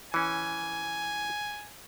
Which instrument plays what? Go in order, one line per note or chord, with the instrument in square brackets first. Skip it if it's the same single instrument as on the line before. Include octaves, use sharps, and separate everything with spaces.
[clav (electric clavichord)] E3 C#4 [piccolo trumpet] G#5